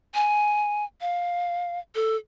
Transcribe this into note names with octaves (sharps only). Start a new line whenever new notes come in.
G#5
F5
A4